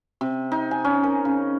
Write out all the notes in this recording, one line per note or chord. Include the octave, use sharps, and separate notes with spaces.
C3
D#4
G#5
C#4
A#4
C#3